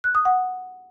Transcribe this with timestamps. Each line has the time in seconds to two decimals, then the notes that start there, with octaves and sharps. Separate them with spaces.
0.04 F#6
0.15 D#6
0.25 F#5